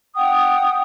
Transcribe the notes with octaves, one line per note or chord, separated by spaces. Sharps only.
F#5 G5 D#6